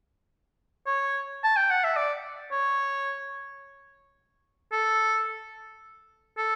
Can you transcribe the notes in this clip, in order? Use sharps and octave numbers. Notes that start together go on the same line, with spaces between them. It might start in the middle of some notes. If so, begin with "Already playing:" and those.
C#5
A5
G5
F#5
E5
D5
C#5
A4
A4